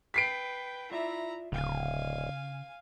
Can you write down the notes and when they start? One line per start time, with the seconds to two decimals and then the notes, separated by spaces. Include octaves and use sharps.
0.14 B4 G5 B6 C7 D7
0.91 E4 F4 D5 E5 A#5
1.52 D1 C#3 F5 G#5